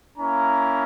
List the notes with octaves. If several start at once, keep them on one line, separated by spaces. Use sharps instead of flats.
A#3 C#4 E4 A#5